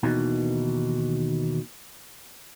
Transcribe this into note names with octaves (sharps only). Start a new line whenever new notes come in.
D#2 B2 D#3 E3